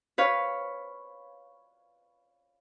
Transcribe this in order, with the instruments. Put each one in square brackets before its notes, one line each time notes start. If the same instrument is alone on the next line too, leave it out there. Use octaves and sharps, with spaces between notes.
[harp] B4 C#5 F5